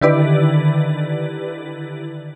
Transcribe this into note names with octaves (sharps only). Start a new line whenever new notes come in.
D3 D#3 E4 G4 B4 D5